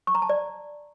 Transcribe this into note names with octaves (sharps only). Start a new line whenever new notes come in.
C#6
A#5
A5
D5